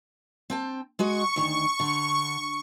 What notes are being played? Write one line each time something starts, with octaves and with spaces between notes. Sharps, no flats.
C4 G5 A5
G#3 F#4 D#5 C#6
D2 D#3
D3